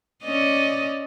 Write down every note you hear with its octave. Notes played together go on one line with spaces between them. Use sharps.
C#4 D5 D#5